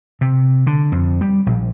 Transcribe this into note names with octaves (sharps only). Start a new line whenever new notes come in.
C3
D3
F2
G3
A#1